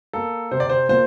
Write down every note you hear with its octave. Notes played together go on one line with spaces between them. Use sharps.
A#3 A4
C3 C5
D5
C5
A#2 C5